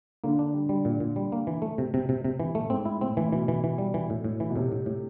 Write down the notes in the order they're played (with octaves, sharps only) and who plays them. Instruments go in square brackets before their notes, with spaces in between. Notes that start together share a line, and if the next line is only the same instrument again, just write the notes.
[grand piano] D3 [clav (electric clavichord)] A#3
[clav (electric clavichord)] D4
G3
G3
A#2
A#2
G3
A#3
E3
A3
C3
C3
C3
C3
E3
[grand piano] A2 [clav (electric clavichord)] A3
[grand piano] G#2 [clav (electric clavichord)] C4
[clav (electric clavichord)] E4
[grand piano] A2 [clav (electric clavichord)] C4
[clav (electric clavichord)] E3
[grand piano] B2 [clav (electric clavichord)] E3
[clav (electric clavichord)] E3
E3
G3
E3
A2
A2
E3
[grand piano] B2
[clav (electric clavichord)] A2 [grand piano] C3
[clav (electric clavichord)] A2
A2